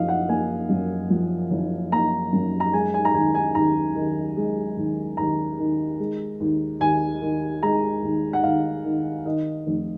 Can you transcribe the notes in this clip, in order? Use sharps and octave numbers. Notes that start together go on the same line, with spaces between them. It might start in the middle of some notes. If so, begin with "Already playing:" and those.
Already playing: F#1 F3 D#5 F5
F#5
A#3 G#5
F#2
F3
F#1
A#3 A#5
F#2
A#5
G#3 G#5
G#5
A#5
D#2 G#5
G#5
D#2 A#5
D#3
G#3
D#2
D#2 A#5
D#3
G#3
D#2
D#2 G#5
D#3
G#3 A#5
D#2
F#5
D#2 F5
D#3
D#3 D#5
F1